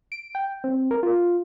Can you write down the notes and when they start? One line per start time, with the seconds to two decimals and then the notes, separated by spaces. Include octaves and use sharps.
0.12 D7
0.35 G5
0.64 C4
0.91 A#4
1.03 F4